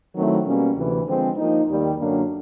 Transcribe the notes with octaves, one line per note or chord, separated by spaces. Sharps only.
D#3 F#3 A3 C4 E4
B2 G3 A#3 C#4
D2 C3 E3
D3 F3 G#3 C4
F3 A#3 D#4
D#2 D#3 G3 A#3
F#2 D3 F#3 A#3 D4